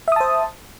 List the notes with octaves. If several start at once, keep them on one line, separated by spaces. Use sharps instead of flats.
C5 E5 A5 D#6